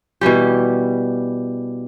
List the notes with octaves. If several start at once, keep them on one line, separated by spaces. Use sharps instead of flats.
B2 E3 G3 G4